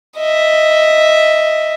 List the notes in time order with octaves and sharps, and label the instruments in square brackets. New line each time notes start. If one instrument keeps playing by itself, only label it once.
[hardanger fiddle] D#5 E5